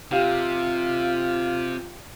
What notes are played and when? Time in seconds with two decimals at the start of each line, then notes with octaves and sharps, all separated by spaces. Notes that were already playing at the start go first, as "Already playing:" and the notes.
0.11 C3 F4 G4 F5